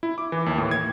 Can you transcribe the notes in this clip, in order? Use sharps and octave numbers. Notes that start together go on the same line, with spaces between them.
E4
D6
E3
D#2
A2
G#6